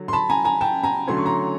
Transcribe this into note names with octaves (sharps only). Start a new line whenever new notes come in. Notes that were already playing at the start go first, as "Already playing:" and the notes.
Already playing: D3 F#3
C6
A5 B5
G#5 A#5
G#5 A#5
G5 A5
G#5 A#5
D3 F#3 A3 C#4 C6
C#6
A#5 C6